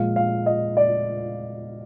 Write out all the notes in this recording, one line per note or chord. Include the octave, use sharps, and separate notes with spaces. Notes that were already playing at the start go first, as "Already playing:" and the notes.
Already playing: A#2 F3 G#3 F5
F5
D#5
D5